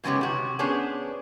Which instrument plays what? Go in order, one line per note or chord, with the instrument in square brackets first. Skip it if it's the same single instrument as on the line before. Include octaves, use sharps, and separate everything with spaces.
[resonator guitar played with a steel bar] F#2 C#3 G#3 B3 C#4 G4
C3 F#4
B3 C#4 D4 G#4 C5 C#5